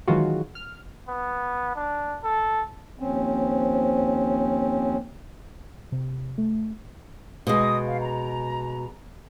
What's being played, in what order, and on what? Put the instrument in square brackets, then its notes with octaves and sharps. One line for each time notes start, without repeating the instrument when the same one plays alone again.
[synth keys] D#3 E3 F#3 G#3 F4 F#4
F6
[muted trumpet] B3
D4
A4
[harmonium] D#2 F3 C4 C#4
[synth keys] C3
A3
[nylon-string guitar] B2 G#3 [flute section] D#5 D#6
[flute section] F5
A#5